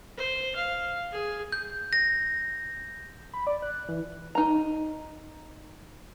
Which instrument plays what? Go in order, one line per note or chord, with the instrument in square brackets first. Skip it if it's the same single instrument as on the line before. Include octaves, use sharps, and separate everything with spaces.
[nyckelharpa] C5
F5
G#4
[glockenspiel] G6
A#6
[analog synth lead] B5
D5
F#6
E3
[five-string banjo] D#4 A#5